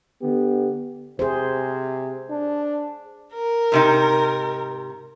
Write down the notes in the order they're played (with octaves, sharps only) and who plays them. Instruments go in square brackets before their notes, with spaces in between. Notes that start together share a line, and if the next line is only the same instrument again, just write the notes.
[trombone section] D3 B3 G4
[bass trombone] C3 [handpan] G#4 C5
[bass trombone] D4
[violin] A#4
[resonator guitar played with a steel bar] G#2 C3 D#4